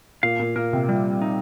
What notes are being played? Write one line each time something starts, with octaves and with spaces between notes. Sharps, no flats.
A#2 F5
A#2
A#2 A#4
C3
F3 G3
D#4